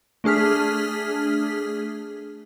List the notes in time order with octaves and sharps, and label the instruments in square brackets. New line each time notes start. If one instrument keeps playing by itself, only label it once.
[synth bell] A3 D4 G#4 F6 B6